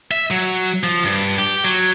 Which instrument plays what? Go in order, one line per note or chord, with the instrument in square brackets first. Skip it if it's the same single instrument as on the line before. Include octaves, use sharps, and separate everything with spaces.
[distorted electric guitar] E5
F#3
F3
G2
G4
F#3